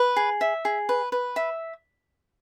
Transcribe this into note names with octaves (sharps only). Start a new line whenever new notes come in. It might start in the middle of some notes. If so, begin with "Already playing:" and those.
Already playing: B4
G#4
E5
G#4
B4
B4
E5